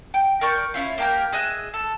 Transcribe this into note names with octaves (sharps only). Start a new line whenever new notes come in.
G5
A#4 D5 C#6 G6
C#4 E4 F4
A#3 G4 A#4 G5
G#4 D#5 E5 F#6
A4